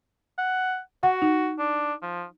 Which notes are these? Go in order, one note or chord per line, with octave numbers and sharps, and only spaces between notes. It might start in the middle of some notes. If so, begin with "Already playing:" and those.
F#5
F#4 F#5
D#4
D4
F3